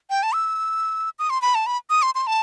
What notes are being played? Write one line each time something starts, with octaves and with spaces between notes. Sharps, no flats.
G5
A5
E6
D#6
C6
B5
A5
B5
D#6
C6
C6
A5